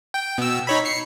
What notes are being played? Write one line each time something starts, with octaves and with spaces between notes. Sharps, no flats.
G5
B2 E6
D#4 C#5 B5
C7 C#7